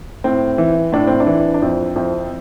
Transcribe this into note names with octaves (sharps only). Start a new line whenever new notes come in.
A2 C4
E3
A2 D4
C4
D4
E3
D4
F2 C4 E4
F2 C4 E4